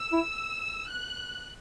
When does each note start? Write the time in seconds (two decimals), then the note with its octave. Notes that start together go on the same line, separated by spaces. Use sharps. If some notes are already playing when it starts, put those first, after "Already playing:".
Already playing: E6
0.13 E4
0.89 F#6